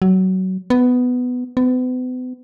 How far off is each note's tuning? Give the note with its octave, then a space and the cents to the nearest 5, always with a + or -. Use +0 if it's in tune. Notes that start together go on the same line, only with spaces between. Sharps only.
F#3 +20
B3 +10
B3 +40